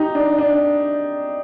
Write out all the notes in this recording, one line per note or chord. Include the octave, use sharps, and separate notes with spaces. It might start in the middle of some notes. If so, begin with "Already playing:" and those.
Already playing: D#4 G4
D4
D4